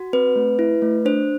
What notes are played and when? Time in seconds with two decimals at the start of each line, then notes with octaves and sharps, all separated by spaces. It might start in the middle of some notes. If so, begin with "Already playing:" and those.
Already playing: F#4
0.13 C4 B4
0.36 A3
0.59 E4
0.82 A3
1.05 D4 C5